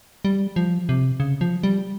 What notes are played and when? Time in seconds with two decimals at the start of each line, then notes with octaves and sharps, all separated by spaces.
0.25 G3
0.56 F3
0.89 C3
1.20 C#3
1.41 F3
1.63 G3